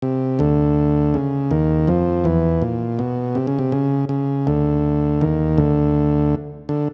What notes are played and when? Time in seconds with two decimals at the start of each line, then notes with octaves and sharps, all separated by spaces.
0.02 C3
0.39 D2 D3
1.14 C#3
1.51 D#2 D#3
1.87 F2 F3
2.24 E2 E3
2.62 A#2
2.99 B2
3.35 C3
3.47 C#3
3.59 C3
3.72 C#3
4.09 C#3
4.47 D2 D3
5.21 D#2 D#3
5.57 D2 D3
6.69 D3